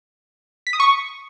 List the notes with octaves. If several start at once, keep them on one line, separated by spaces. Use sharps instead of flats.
B6
D#6
C#6